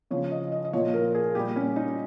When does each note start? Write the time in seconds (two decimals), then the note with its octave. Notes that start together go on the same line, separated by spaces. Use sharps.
0.11 C#3 F3 C#5
0.31 D#5
0.52 D#5
0.65 D#5
0.73 A#2 F3 C#5
0.94 A#4
1.15 G#4
1.35 A#2 G3 G4
1.56 C#4
1.76 D#4